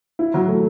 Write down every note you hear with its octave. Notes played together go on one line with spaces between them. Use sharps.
E4
F#3
A3